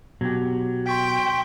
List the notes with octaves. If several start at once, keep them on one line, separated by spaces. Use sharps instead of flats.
B2 F#3 G4
G5 C6 C#6 B6